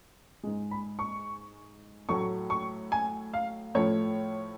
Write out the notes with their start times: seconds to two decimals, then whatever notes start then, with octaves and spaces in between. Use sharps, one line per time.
0.44 G#2 G#3
0.71 B5
0.99 C#6
2.09 A2 F#3 A3 C#6
2.50 C#6
2.92 G#5
3.34 F5
3.75 A2 F3 A3 C#5